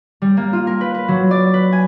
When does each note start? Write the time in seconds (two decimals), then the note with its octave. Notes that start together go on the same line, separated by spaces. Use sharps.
0.22 G3
0.37 A#3
0.53 F4
0.67 A#4
0.81 B4
0.94 B4
1.08 F#3
1.31 D5
1.54 B4
1.72 G#5